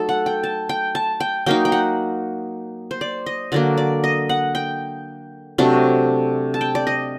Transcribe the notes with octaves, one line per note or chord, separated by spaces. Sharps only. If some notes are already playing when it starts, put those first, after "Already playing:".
Already playing: F#3 A3 D#4 A4
F#5
G5
A5
G5
A5
G5
F#3 A#3 D#4 G5
G5
F#5
C5
D5
D#5
D3 F#3 A#3 D5
D5
D#5
F#5
G5
C3 F#3 A3 D4
A5
G5
D5
D#5